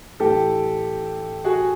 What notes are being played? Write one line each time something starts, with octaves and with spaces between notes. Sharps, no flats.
A2 E3 G4 A4
F#4 G#4